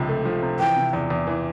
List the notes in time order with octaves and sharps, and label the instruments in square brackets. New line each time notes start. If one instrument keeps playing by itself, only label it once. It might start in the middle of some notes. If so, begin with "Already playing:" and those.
Already playing: [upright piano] C#2 C3 F3
A3
F3
C3
[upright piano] E3 [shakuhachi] G5
[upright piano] C3
E2
E2
E3